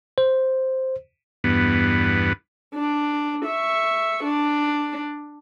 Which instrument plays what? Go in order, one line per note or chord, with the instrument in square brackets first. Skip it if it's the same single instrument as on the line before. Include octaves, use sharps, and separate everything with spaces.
[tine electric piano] C5
[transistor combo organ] E2 G2 B3
[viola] D4
E5 C#6
D4